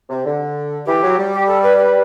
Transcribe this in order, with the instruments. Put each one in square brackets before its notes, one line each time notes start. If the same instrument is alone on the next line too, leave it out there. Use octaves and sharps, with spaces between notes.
[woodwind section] C3
D3
[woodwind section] E3 [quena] G4
[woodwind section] F#3
G3
[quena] G4
A4
B4
B4